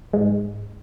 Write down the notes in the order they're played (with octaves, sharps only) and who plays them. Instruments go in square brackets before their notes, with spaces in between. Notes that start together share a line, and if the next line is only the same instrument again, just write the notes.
[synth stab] G#2